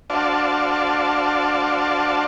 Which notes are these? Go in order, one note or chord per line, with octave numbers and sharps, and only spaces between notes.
D4 F#4 C5 D5 F5 A5